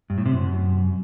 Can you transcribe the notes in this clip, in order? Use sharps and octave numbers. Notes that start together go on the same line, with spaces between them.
G2
A2
C3
F#2